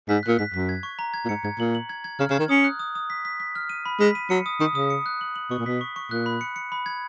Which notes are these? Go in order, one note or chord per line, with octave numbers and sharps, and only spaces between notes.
G#2 B6
A#2 F#6
G#2 B6
F#2 B6
G#6
C#6
A#5
G#6
A#2
G#2 C#7
G#2 G#6
A#2 F#7
F#7
G#6
G#6
C#3 F6
C#3
D#3 G#6
C#4 D#6
F#6
D#6
D#6
B6
B6
B6
F6
D#7
B5
G#3 B6
D#7
F#3 C#7
D#6
D#3 D#6
C#3 D#6
C#7
F#6
F#7
F#7
B2 C#6
A#2
B2 B6
C#6
C#6
A#2 F#6
B5
C#7
C#7
B5
G#6